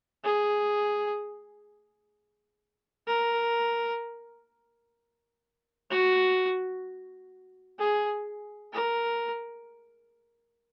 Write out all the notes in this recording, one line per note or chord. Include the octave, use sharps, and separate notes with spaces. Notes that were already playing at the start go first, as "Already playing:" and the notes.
G#4
A#4
F#4
G#4
A#4